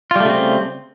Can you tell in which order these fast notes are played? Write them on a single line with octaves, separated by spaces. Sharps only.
F4 G3 A3 C#3 C4